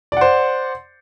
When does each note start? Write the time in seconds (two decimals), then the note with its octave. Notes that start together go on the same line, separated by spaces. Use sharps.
0.12 D5
0.17 F#5
0.21 C5